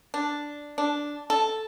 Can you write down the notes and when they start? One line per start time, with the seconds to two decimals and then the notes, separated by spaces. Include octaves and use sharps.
0.14 D4
0.78 D4
1.30 A4